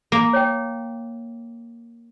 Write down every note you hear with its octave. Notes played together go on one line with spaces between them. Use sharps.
A#3
C#5 G5